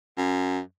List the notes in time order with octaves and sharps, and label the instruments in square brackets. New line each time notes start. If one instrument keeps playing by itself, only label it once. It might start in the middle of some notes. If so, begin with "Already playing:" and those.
[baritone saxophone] F#2